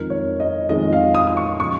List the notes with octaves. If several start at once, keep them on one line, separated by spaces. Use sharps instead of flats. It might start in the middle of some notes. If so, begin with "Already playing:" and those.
Already playing: F2 D#3 G#3 A#4
C#5
D#5
F2 D#3 G#3 D#5
F5
D#6
D#6
C#6
C#3 F3 C#6